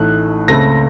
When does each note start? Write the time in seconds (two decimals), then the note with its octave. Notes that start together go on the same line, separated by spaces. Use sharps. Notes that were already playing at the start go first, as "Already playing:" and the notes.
Already playing: A1 A2 A3 D#4 F#6
0.48 C#2 C#3 A3 C4 A#6